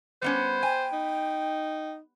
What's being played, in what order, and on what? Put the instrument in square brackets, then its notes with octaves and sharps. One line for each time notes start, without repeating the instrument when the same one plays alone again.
[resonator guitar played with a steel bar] G3 B3 C#4 [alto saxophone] C5
[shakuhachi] G5 [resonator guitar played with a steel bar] G#5
[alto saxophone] D#4